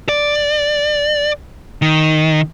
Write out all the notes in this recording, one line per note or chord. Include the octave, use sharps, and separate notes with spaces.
D5
D#3